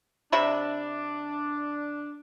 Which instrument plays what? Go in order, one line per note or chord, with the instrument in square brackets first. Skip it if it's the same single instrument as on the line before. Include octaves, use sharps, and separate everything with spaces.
[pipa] C3 E5 B5 [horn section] D4